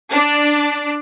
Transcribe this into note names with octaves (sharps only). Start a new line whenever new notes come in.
D4